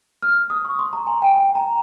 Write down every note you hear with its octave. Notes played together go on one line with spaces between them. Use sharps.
F6
D#6
C#6
C6
A#5
G#5
G5
G5
A#5